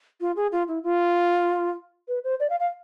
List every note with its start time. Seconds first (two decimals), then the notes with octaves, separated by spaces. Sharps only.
0.21 F4
0.36 G#4
0.52 F4
0.68 E4
0.83 F4
2.08 B4
2.24 C5
2.40 D5
2.50 F5
2.60 F5